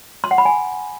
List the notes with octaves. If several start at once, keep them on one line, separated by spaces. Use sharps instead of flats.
C6
F#5
B5
G#5